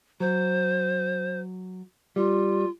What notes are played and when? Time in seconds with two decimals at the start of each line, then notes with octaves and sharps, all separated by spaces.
0.20 F#3 C5
2.16 G3 F4